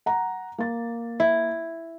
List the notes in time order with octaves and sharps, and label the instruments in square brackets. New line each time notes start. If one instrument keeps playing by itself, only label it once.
[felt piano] F#5 A#5
A#3 A6
[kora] E4